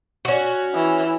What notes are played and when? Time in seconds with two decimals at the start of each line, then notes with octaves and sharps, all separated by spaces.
0.25 C#4 F#4
0.75 E3